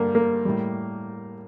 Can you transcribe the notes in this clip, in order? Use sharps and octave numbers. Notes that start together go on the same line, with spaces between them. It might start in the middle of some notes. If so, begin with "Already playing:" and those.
Already playing: G2 D3 G3 A#3
A#3
A2 G3